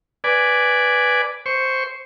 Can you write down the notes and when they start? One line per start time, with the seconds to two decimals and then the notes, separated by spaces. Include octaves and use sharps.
0.24 B4 D5 G#5
1.46 C5 C#6